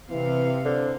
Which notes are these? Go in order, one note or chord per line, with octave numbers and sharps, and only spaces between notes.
C3 E3 C4 F5
D3 C5